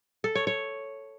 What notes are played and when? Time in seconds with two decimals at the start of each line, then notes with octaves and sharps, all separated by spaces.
0.24 A4
0.35 C#5
0.47 C#5